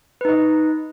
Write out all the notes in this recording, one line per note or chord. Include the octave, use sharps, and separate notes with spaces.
D#4 B4 D#5